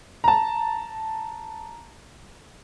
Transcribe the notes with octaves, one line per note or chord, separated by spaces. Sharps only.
A5 A#5